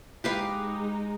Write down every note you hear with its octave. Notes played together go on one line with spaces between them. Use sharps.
G#3 D#4 G4 B4 F5